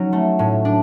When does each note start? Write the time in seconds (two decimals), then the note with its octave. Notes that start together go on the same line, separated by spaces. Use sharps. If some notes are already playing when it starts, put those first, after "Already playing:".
Already playing: F#3 C#4 D#4
0.13 A3
0.39 A2
0.65 D4